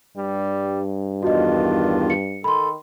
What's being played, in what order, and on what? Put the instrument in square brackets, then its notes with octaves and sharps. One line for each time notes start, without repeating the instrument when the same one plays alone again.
[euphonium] G2 [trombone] G3
[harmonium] E2 D#3 F4 [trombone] D4 [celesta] F#4 D#5
[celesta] C#7
[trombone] D#3 [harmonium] A4 [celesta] B5 C6